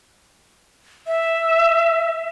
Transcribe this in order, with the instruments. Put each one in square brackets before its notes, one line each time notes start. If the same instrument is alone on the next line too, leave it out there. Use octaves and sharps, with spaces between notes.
[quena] E5